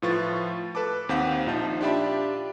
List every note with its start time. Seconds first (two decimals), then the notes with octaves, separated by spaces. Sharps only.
0.02 A2 F3 F4 B4 C#6 A6
0.75 A4 B4 A5 D6
1.09 D#2 C4 F5 F#5 G6 B6
1.46 A#1 F3 D#4 A5
1.81 D4 F4 G4 D5 E5 B5